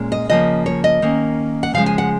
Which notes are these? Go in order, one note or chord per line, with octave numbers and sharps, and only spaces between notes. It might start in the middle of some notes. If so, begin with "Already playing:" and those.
Already playing: A#2 G#3 C#4
D#5
C#3 F3 A#3 C#4 D#5
C#5
D#5
D#3 A#3 C#4
F#5
C#3 F3 G#3 F5
G#5
F#5